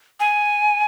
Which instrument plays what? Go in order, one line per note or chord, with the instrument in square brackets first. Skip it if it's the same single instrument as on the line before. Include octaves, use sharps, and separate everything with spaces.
[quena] G#5